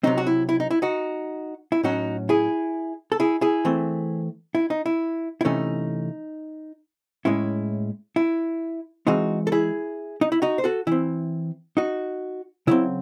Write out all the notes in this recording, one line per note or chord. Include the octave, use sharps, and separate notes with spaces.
C3 F#3 C4 D#4
F#4
E4
E4
D#4
E4
D#4 F#4
E4
A2 F#3 C#4 D#4 F#4
E4 G#4
A4
E4 G#4
E4 G#4
E3 A3 C4
E4
D#4
E4
E4
C3 E3 A3 C#4 D#4
A2 G#3 C#4 E4
E4
E3 G#3 C4 D#4 F#4
A4
E4 G#4
D#4
E4
D#4 F#4
C5
F#4 A4
E3 C4 E4
D#4 F#4
C#3 F#3 C4 E4